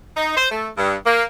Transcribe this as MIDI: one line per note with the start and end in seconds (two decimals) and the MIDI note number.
0.16 0.36 63
0.37 0.48 72
0.51 0.68 57
0.77 0.95 43
1.06 1.23 58